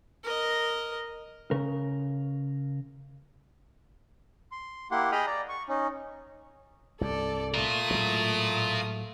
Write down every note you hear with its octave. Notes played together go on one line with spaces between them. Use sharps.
A#4 D#5
C#3 A#4
C6
A#3 E4 G4 F#5 C6
G#4 D#5 G5 B5 D#6 F6
D5 A#5
C#6
C#4 D#4
C2 G2 A4 D5
A3 F4 A#4 D#6
A2 F#3 G#3